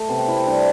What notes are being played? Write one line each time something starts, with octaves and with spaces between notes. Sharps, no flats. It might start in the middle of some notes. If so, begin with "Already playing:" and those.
Already playing: A3 A4
C3 B3
C4
C3 E4
C4
G3 D4